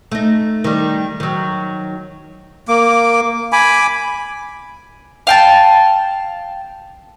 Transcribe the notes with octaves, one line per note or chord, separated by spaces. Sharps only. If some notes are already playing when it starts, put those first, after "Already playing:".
A3 D#4
D#3 G3
D#3 F#3
A#3 D6
G#5 B5 D6
F5 G5 A5